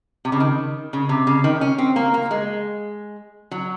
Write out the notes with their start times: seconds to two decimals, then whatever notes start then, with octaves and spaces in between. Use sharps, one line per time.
0.25 C3
0.32 C#3
0.40 D#3
0.93 C#3
1.09 C3
1.27 C#3
1.44 D#3
1.61 C#4
1.78 C4
1.96 A#3
2.14 A#3
2.31 G#3
3.51 F#3